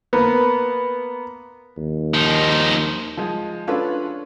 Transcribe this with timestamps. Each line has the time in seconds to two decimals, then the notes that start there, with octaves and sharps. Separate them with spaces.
0.13 A#3 B3
1.77 D#2
2.14 F3 D#4
3.17 F3 G#3
3.67 C#4 D4 F4 A4 B4